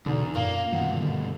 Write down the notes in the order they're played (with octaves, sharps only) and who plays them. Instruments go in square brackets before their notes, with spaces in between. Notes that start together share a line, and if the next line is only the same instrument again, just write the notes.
[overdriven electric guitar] E2 [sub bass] B2 [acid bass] D3 [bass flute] D#4
[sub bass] F#2 [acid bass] A#2 [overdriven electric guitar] A#3 [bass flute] F5
[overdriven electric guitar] G2 B2 [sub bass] D#3 [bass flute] F#5
[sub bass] D3 [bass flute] D#3